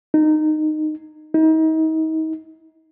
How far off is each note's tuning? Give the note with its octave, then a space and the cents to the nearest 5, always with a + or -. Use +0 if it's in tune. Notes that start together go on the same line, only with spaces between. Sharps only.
D#4 -15
D#4 +35